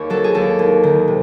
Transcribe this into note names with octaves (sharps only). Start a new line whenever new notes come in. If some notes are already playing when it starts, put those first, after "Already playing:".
Already playing: D#2 C#5
F#3 A4
G#4
D#2 A4
D#2
D#3
C3